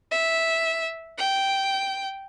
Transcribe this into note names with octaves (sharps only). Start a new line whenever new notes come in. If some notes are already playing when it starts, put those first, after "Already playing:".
E5
G5